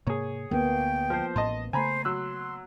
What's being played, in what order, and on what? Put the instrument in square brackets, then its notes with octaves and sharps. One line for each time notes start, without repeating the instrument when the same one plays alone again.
[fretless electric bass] G#2 C3 A#3 [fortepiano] G#4 C#5
[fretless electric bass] D2 [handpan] A#3 B3 [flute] G5
[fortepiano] F3 C5
[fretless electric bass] A1 A2 [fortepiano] D#5 A5 C6
[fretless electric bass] C#3 A3 [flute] C5 [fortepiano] G#5 A#5 B5
[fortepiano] F#3 E6 F#6 [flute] C6